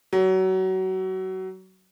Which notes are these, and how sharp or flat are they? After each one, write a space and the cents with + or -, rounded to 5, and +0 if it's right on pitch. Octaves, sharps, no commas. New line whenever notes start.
F#3 +25